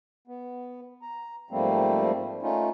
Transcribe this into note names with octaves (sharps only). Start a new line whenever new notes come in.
B3
A#5
G#2 F3 G3 A3 A#3 C4
A3 C#4 D#4 F4